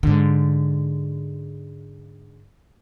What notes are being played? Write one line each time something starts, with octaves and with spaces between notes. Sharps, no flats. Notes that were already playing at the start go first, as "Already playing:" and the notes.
G#2 D3